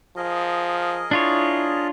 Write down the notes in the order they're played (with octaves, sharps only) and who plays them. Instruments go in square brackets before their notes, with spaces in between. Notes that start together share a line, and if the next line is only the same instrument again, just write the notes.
[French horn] F3 [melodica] G#4 A#4 D#5
[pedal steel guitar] D4 F4 C#5 [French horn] E4